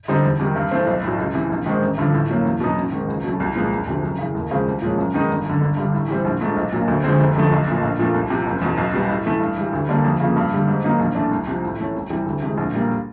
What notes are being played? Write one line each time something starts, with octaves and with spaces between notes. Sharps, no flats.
D3 G3 C4 D#4
E2
C3 D#3 G3
G2
E3 A3 C4
B1
A2 F#3
C#2
C3 E3
A#1
G#2 D#3 G#3 C4
A1
G2 D3 F3
A2
F#3 A#3 C#4 E4
E2
B2 F#3 B3 D#4
A1
G#2 D#3
C#2
B2 F#3 A3
C2
A#2 F3 G#3 B3
E1
D2 C3 F3
F#2
C#3 E3
D#2
C#3 F3 G#3 C4
C2
A#2 F3 G#3 C#4
F#2
D#3 G#3 B3 D#4
G1
F#2 D3
G1
G2 D3 G3
A2
E3 G3 C4
A#1
G#2 F3 A3
B1
A#2 F#3 A#3
D2
D3 F3 G#3 C4
F1
F2 D3 F3 A3
B1
A#2 F3 A3
A#1
A#2 F3 A3
C2
C3 F3
F#1
E2 B2
B1
B2 G3 B3
A2
E3 A3
G2
E3 G3
D2
D3 G3 A#3 D4
F2
C#3 F3 A#3
G2
D3 G3
G#2
D#3 F#3 A#3 D#4
A#1
A2 E3 A3 D4
C2
C3 F3
A2
E3 A3 C#4
C2
C3 E3 G3
D2
C3 E3 G#3
A#1
A#2 G3 A#3